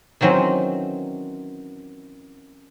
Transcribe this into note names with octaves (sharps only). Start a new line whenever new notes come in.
D#3 E3 F#3 C4 C#4